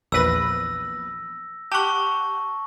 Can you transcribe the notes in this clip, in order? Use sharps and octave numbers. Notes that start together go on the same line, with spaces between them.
A#1 E2 B4 E6 A#6
G4 F#5 A5 C#6